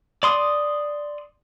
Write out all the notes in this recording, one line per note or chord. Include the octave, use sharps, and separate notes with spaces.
D5 C6 D#6